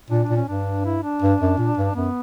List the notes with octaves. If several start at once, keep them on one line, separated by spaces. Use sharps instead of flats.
A#2 D4
D4
A#2
C#4
G2 D4
E4
D4
G2
F#2
A#2
G2
F#2 B3